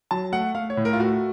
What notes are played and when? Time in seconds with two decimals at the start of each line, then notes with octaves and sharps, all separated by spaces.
0.11 F#3 A5
0.32 A3 F#5
0.55 A3 F5
0.70 C#5
0.77 A2
0.85 A#4
0.93 F4
1.00 A3 F#4